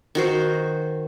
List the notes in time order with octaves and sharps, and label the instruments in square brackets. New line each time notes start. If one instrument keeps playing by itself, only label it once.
[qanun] D#3 F#4 C5